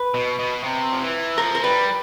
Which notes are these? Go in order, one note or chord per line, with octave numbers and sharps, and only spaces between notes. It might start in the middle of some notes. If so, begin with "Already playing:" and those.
Already playing: B4
B2
B2
C3
F3
E3
F3 A#4
A#4
G3 B4